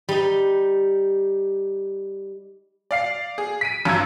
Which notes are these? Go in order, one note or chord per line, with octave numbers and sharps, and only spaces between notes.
G3 D#4
D5 F5 C7
G#4
B6 D7 D#7
A1 G2 F4 A#5 E6 G#6